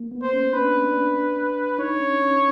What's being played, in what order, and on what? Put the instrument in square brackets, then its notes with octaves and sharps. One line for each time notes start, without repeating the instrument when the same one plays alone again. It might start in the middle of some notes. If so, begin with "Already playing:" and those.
Already playing: [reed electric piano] A#3
B3
[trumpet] C5
[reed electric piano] C#4
[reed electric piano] D4 [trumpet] B4
[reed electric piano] D4
[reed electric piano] D#4 [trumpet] C#5
[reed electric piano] C#4
C#4